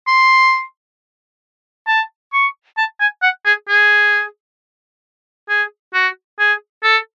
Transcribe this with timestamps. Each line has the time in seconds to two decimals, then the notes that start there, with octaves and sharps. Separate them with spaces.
0.07 C6
1.87 A5
2.33 C#6
2.78 A5
3.00 G#5
3.23 F#5
3.46 G#4
3.69 G#4
5.49 G#4
5.94 F#4
6.39 G#4
6.83 A4